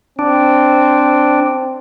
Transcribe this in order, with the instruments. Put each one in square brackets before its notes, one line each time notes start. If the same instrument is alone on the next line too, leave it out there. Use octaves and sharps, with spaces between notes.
[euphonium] C4 [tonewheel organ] D4